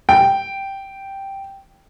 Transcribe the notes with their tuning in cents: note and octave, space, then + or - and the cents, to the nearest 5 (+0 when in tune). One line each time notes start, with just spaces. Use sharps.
G5 -5